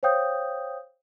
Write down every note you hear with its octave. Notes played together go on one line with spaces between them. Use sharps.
C5 C#5 F5 G5 D#6 G6